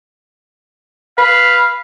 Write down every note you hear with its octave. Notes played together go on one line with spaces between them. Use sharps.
B4 F5